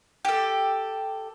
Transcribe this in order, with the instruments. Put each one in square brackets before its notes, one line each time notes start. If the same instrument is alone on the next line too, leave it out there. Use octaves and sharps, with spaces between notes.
[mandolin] G4 A4